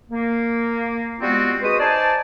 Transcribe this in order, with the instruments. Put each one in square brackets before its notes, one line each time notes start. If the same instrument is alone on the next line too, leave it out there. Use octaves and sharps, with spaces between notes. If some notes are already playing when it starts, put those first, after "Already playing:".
[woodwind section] A#3
G3 G#3 B3 C4 F4 F#4
G#3 F#4 B4 C5 D#6
D#4 C5 D5 G#5 A5